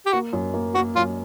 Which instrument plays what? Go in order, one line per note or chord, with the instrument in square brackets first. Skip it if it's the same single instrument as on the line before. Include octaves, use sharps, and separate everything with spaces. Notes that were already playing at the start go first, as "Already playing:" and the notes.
[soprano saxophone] G4
[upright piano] A#3 [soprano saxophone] F#4
[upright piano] F#2
A#3
[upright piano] A#3 [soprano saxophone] F#4
[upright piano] F#2 [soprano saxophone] F4